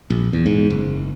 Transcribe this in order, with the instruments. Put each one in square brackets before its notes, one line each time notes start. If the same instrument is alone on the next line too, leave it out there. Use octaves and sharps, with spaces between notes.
[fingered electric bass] A#1
E2
G#2
F#1